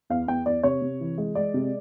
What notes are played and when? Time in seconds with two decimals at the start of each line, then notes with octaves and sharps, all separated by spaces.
0.10 E2 F5
0.27 E2 G5
0.46 E2 D5
0.63 C3 C#5
0.82 C3
1.00 E3
1.18 G#3
1.35 G#3 D5
1.54 C3